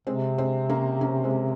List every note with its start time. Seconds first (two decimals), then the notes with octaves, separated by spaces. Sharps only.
0.07 C3 G#3 C4
0.38 G#3 C4
0.69 A#3 C#4
1.01 A#3 C#4
1.24 G#3 C4